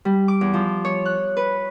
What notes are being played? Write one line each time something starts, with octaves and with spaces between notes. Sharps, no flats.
G3
D6
E2
F3
C#5
F#6
B4